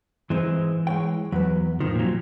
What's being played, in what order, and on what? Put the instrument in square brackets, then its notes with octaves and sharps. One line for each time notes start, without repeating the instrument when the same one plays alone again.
[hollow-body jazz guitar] G#2 G#3 C4 [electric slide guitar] E3
[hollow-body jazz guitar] G#3 C#5 G5
[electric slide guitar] E2 [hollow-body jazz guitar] F#3 B4
[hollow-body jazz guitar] A2 C3 F3 [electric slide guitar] D#3
[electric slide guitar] A#2 F#3